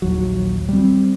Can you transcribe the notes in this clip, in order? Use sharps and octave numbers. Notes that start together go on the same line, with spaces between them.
A#1 D#2 F#3
G3 C4